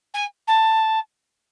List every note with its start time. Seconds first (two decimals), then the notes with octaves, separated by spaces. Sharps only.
0.14 G#5
0.47 A5